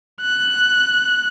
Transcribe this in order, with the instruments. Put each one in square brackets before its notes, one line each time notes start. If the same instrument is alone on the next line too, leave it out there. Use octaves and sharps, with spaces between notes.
[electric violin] F#6